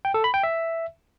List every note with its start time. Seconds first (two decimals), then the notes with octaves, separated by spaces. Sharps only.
0.05 G5
0.14 A4
0.24 B5
0.34 G5
0.43 E5